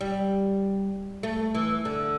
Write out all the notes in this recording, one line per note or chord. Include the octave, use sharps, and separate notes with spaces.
G3
A3
E3
D3